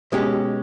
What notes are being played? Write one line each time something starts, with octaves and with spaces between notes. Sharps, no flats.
B2 G#3 C#4 G4